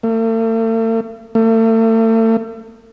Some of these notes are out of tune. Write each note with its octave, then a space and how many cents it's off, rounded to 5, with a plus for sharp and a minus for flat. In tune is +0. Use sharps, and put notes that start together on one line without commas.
A3 +45
A3 +40